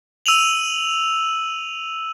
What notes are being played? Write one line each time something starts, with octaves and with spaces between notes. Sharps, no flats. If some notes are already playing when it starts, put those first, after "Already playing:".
E6 D#7 F7 F#7